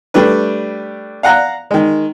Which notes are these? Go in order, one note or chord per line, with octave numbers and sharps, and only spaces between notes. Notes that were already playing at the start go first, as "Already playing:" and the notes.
G3 A3 D4 B4
F5 F#5 A#5 F#6
D#3 G#3